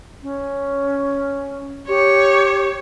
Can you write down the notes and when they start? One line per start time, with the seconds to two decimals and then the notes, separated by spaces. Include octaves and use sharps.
0.23 C#4
1.88 G4 C#5